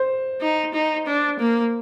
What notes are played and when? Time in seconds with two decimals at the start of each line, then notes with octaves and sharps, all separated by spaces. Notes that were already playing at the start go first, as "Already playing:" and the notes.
Already playing: C5
0.42 D#4
0.74 D#4
1.07 D4
1.39 A#3